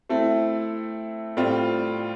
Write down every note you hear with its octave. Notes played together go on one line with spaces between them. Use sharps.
A3 C4 E4 A4
A2 G3 C4 F4